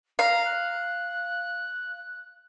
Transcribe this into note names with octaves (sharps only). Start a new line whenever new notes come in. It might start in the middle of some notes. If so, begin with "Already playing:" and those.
F5 A#5
F#6